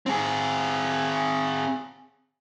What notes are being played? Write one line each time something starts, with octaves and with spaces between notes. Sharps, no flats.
C4 G#4